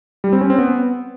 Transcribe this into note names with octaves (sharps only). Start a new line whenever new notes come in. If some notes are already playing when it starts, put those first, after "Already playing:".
G3
C4
C#4
C4
B3